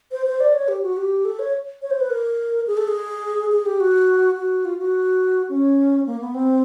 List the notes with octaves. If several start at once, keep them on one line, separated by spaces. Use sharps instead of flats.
C5
C5
D5
C#5
G4
F#4
G4
A4
C#5
C#5
C5
B4
A#4
G#4
A4
G#4
G#4
G4
F#4
F#4
F4
F#4
C#4
A#3
B3
C4